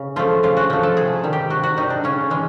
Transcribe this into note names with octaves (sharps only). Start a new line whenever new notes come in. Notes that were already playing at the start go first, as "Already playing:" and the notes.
Already playing: C#3
F3 A3 F4
C#3 F4
F#4
F3 A3
A4
C3 G#4
D#3 G3
G4
C3 F#4
F#4
D#3 G3 D#4
D4
C#3 C#4
E3 G#3